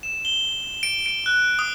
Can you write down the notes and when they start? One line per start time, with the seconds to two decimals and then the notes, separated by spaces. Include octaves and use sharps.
0.03 E7
0.25 G7
0.83 D7
1.06 D7
1.26 F#6
1.59 D#6